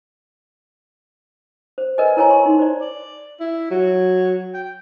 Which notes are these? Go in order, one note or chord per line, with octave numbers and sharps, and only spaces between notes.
C5
A#4 B4 D5 D#5 G#5
E4 A#4 C#5 G#5 A#5
G#5 C6 C#6
D#4 C6
C5 D5
D5
E4
F#3
G5